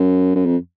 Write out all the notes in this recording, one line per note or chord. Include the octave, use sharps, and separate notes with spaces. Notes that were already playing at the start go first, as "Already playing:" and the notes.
Already playing: F#2
F#2
F2